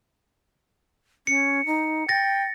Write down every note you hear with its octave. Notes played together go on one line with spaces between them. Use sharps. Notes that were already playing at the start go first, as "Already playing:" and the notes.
C#4 C#7
D#4
G5 A6 A#6